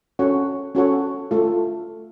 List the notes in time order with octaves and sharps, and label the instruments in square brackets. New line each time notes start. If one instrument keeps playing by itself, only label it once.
[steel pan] C#4 F#4 A4 C#5 F#5
C#4 F#4 A4 C#5 F#5
A3 F4 A4